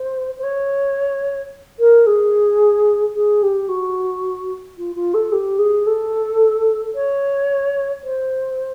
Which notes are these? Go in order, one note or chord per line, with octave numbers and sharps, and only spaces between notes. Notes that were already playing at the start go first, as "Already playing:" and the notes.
Already playing: C5
C5
C#5
A#4
G#4
G#4
G4
F#4
F4
F4
A4
G4
G#4
A4
C#5
C5